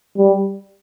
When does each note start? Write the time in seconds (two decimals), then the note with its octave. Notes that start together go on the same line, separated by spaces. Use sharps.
0.17 G3